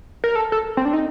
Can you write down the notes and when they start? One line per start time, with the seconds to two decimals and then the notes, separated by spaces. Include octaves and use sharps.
0.24 A#4
0.36 A4
0.52 A4
0.77 C4
0.85 D4
0.93 D#4